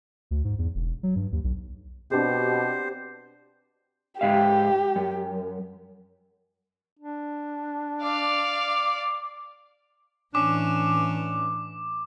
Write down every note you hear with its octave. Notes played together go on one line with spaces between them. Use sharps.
D2
G#2
E2
E1
F#3
G2
D#2
B1
B2 C4 D4 G4 C5
G#2 G4 E5 F5
F#2
D4
D5 F5 D6
A2 E3 C#4 D4 D6